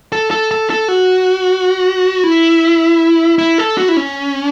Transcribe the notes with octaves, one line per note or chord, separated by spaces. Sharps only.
A4
A4
A4
A4
F#4
E4
E4
A4
F#4
E4
C#4